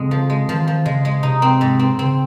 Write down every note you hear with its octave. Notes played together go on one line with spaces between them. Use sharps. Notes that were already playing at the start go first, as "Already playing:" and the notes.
Already playing: F2 C#3 G#3
F3
G#3
D#3 F3
F3
C#3 G#3
G#3
C3 D#4
C4
G#2
C4
C#3 C4